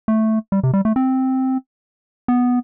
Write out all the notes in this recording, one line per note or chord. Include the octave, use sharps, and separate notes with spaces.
A3
G3
C3
G3
A3
C4
B3